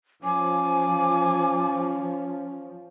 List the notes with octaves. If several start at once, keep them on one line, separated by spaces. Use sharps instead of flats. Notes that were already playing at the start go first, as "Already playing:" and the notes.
F3 C#4 G#5 D6